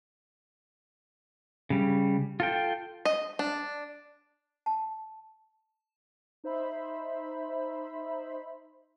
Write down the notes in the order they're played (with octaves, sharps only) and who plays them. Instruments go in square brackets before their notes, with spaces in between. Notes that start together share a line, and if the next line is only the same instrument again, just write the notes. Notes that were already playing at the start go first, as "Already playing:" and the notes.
[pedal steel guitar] C#3 G3
F4 A4 G5
[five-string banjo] D#5
D4
[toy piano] A5
[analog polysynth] D#4 C5 E5 B5